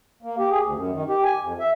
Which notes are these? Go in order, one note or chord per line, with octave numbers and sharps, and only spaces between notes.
A#3
G4
G#4
D2
F#2
D#3
G4
G#5
F2
E5